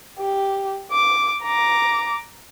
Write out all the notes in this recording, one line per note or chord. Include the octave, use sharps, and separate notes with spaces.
G4
D6
A#5 D6